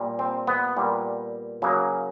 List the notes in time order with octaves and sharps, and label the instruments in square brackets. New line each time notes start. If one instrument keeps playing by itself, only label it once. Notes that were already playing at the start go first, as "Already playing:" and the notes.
Already playing: [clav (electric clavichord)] A#2 G3 A#3
C4
B3
A#2 G3 A#3
C#3 F#3 A#3